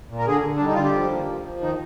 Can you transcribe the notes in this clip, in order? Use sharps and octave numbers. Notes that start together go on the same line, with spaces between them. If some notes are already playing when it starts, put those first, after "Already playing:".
A#2
A#4
D3 G#4
D3
G3 D4
D#4
D3 F4
G4
F3
A#3
F3
F3
D#3 D#4